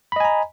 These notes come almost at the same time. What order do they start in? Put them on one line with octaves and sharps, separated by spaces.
B5 D#5 G#5 A#5